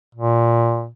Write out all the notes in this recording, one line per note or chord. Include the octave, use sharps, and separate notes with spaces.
A#2